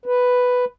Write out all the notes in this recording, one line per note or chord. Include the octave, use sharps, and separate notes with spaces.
B4